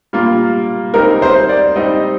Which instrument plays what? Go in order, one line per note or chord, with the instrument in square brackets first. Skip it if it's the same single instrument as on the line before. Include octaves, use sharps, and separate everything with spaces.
[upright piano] G3 A#3 F4
[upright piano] G3 C4 D#4 [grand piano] A#4
[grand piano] C5
D5
[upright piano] G3 C4 D#4 [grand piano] D#5